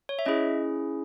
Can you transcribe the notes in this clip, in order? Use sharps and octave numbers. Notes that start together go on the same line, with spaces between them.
C#5
E5
C#4 E4 G#4 D#5